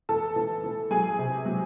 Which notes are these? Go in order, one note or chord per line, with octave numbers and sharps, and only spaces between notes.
E3 A4 A5
E3
E3
F#3 G#4 G#5
C3
F#3